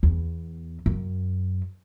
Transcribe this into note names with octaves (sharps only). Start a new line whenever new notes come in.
E2
F#2